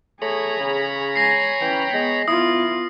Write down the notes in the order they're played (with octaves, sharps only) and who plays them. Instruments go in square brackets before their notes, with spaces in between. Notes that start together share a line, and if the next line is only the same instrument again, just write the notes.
[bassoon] A3 [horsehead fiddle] G#4 [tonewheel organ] C#5 A#5 B5
[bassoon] C#3
[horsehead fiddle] G#3 G#5 [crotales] A#6 C7
[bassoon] E3 [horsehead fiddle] C#4 G5
[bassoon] G#3 [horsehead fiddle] B3
[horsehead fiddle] B3 F4 [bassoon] E4 [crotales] D#6